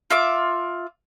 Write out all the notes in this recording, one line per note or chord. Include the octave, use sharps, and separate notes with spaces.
F4 E5 D6